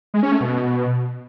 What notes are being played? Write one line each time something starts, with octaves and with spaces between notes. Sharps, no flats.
G#3
C#4
A3
B2